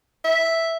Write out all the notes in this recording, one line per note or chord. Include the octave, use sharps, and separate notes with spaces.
E5